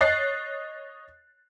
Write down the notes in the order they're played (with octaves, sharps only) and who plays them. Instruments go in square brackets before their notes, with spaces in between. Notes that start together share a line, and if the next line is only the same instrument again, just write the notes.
[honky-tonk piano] C#5 D#5 F#6 A6 C7